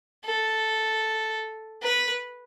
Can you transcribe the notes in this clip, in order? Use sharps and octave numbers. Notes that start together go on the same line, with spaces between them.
A4
B4